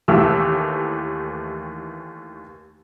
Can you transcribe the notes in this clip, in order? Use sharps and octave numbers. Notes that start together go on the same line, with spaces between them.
D#2 D#3 E3 A3 G4 E6